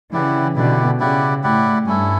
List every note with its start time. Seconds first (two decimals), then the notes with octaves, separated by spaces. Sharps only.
0.12 C#3 E3 E4 G4 D5 F#5
0.56 B2 D3 E4 G4 D5 F#5
0.99 C#3 E4 G4 D5 F#5
1.43 A2 E4 G4 D5 F#5
1.86 G2 C#4 E4 A4